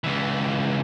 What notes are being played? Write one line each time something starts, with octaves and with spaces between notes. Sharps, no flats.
C#2 E3